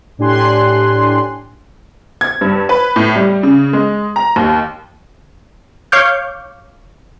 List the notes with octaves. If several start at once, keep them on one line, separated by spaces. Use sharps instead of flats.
A2 D4 G4 G#5 C6 F#6
G#6
G2
B4
A2
G3
C#3
G#3
A#5
D#2
C#5 F5 C#6 D6 F6 G6